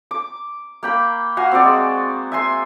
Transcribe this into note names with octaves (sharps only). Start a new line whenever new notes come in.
D6
A#3 G5 B5
F#4 F5 G#5
C4 F#4 D5
G#3
E5 G#5 C6